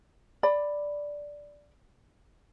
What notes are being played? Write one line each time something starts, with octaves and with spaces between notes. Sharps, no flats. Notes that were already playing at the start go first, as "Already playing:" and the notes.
D5 B5